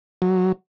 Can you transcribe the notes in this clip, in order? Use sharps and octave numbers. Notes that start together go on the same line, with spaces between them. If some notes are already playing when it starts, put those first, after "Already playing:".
F#3